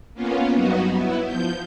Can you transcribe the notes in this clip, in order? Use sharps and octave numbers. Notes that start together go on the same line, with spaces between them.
A#3 B3 C#4 F4
G2 F#3 B3 D#4 F#4
B3 E4
F3 G6